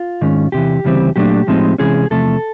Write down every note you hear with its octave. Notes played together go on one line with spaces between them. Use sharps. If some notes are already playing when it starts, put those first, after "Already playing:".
Already playing: F4
G#2 D#3 G#3 C#4
E2 C3 E3 G4
D2 C#3 E3 G3 C4
A#2 F#3 A3 D4 G4
A2 F3 G#3 C4 D#4
C2 C3 E3 G#3 C#4 G#4
E2 C3 F3 A3 A4